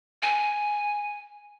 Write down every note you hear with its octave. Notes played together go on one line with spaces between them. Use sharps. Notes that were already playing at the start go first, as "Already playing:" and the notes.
G#5